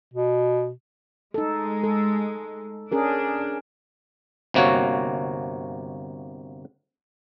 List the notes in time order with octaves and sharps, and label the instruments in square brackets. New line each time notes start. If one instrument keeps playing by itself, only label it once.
[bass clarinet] B2
[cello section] G#3 [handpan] D#4 A4
[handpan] A4
[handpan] C#4 G#4 A#4 [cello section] D4
[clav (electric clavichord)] G1 C3 A#3 F#4 C#5